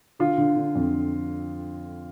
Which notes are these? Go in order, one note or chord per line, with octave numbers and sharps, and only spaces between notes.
D3 F4
D3
D3
F2